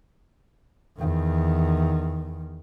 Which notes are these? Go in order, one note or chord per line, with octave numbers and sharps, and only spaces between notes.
E2 D#3